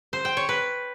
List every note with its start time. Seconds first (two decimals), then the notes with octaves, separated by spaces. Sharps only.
0.13 C5
0.25 G5
0.37 C#5
0.49 B4